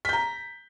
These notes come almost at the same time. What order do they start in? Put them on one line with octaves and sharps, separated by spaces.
B6 G6 A#5